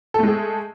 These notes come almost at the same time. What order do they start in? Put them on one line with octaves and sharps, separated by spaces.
A4 A3 G#3 G#4